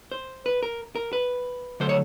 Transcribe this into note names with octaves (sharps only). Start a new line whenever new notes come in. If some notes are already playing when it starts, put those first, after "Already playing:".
C5
B4
A#4
A#4
B4
D3 F#3 A3 C5
C#5